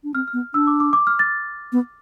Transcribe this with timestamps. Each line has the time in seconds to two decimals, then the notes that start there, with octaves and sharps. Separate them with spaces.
0.04 D4
0.14 C4 F6
0.28 F6
0.33 B3
0.54 D4 E6
0.67 D6
0.80 D6
0.93 D6
1.07 F6
1.19 A6
1.72 B3